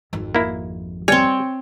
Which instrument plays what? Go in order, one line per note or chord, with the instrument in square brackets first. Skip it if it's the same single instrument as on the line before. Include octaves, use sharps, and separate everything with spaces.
[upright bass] G#1 F2
[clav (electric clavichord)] A#3 E4
[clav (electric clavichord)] G3 G#5 [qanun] C4 C#5